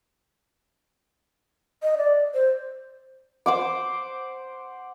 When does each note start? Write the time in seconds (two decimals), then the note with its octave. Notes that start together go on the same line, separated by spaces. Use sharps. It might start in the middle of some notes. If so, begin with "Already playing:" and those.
1.83 D#5
1.98 D5
2.34 C5
3.46 C5 F#5 D6